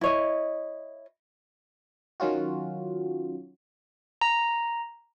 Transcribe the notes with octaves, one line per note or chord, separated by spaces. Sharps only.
E4 C#5 D#5
D#3 F#3 C#4 F4 F#4
A#5